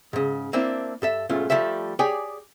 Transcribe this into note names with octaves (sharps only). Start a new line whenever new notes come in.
G#2 C#3
A#3 C4 D4 E4
G2 A4 E5
B1 G#2 A3 C#4 F4
F3 G3 A3 E5
G4 G#4 C#5 D5 G5 G#5